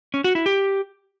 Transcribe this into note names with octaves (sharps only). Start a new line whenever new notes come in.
C#4
F#4
E4
G4